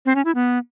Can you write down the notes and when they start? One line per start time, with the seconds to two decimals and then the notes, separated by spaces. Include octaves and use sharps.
0.06 C4
0.15 C#4
0.25 E4
0.35 B3